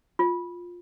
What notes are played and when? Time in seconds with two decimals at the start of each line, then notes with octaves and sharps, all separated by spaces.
0.19 F4